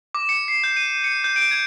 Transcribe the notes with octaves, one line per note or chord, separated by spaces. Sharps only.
D6
C#7
C7
G6
D#7
C#7
G6
D7
G#6